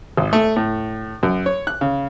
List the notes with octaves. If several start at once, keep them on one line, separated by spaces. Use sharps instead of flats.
G#1
A3
A2
F#2
C#5
F#6
C#3